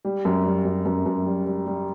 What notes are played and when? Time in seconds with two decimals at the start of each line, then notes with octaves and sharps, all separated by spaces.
0.05 G3
0.25 F#2
0.45 G3
0.65 F#2
0.86 F#2
1.06 F#2
1.26 G3
1.46 G3
1.66 G3